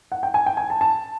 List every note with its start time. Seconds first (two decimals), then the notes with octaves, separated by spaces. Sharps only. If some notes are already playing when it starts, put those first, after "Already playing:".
0.12 F#5
0.23 G5
0.34 G#5
0.46 G5
0.57 G#5
0.70 A5
0.81 A5